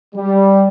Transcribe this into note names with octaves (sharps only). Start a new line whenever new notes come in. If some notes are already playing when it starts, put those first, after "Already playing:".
G3